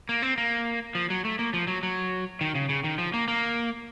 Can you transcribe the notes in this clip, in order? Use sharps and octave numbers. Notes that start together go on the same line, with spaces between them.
A#3
C4
A#3
F3
F#3
A3
A#3
F3
F#3
F#3
D#3
C#3
C#3
D#3
F3
A#3
A#3